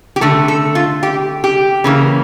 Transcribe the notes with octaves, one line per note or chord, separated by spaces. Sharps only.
G4
D3 A3 A4
A4
F4
G4
G4
C#3 E3 A#3